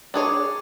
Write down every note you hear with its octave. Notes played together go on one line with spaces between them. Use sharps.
D4 G#4 C#5